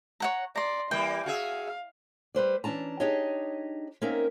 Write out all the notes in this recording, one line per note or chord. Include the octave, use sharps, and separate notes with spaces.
C#5 F#5 A#5
D5 A#5 C6
E3 G3 A#3 G5
F#4 G#4 E5 F5
G3 B4 C5 D5
E3 C#4 D4 A5 A#5
D4 D#4 G4 G#4 C#5 D#5
A#3 C4 C#4 D#4 A#4 E5